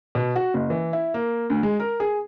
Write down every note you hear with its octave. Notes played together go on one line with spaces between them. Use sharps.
B2
F#4
F#1
E3
E4
A#3
D2
G#3
A#4
G#4